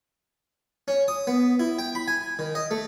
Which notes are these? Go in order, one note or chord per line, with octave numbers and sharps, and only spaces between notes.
C#4
D#6
B3
E4
G5
B5
G#5
D#3
D#5
A3